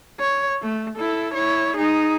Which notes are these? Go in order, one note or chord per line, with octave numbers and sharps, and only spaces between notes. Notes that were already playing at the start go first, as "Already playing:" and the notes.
C#5
A3
E4 A4
E4 C#5
D#4 G#4